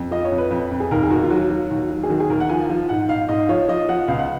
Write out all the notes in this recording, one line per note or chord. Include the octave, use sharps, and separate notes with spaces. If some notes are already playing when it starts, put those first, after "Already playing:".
Already playing: F2
F3 D#5
C#5
F2
B4
F2
F2
G#4
D#2 A#4
G#4
D#2 F#4
F4
F#3 F#4
F#3
D#2
F#3
G#4
D#3 F#4
G#4
D#2 A#4
F#5
F3 G#5
F3
G#2 F#5
G#2 F5
G#2 D#5
F3 C#5
F3 D#5
F3 F#5
C#2 F5
F#5